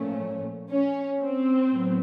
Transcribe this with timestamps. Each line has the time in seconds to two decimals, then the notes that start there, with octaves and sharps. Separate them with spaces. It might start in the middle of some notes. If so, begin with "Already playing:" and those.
Already playing: A#2 F3 A3 C#4
0.70 C#4
1.21 C4
1.71 A2 F#3 B3